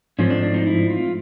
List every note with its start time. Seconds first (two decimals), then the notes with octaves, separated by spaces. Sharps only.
0.19 G#2 F3 A3 C4 C#4
0.30 D4
0.42 D4
0.54 D#4
0.67 E4
0.90 F4